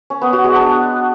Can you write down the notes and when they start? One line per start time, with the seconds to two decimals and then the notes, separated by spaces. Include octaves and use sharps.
0.10 C#4
0.22 B3
0.33 F#4
0.44 G#3
0.55 D4